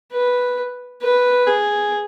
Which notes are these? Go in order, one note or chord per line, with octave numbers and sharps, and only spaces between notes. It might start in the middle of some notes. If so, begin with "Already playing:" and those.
B4
B4
G#4